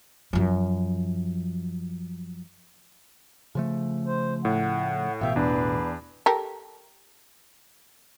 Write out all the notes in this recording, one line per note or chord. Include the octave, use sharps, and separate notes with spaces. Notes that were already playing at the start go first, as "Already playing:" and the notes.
F#2 F3
C#3 F3 A3
C5
A2 F#5
A1 B2 E5 F5 G5
E2 D4 B4
G4 A4 A#4